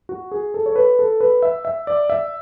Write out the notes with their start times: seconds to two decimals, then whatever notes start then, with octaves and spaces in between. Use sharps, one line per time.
0.09 F#4
0.32 G#4
0.54 A4
0.66 C#5
0.76 B4
0.99 A4
1.21 B4
1.42 E5
1.65 E5
1.87 D5
2.10 E5